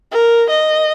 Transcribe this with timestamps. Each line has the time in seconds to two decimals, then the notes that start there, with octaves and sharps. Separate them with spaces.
0.12 A#4
0.50 D#5